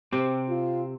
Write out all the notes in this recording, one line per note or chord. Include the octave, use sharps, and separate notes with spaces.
C3 C4 G4 C5
F4